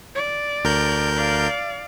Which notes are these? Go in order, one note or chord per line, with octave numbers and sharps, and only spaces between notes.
D5
D2 A#4 G6
D5 F5